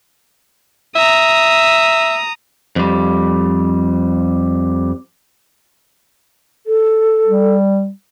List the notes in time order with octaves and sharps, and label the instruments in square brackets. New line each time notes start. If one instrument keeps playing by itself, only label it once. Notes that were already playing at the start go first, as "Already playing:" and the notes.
[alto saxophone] E5 [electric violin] A#5 D#6
[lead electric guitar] F2 G3
[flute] A4
[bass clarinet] G3